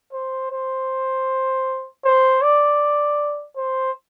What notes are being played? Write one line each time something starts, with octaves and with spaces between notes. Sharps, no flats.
C5
C5
C5
D5
C5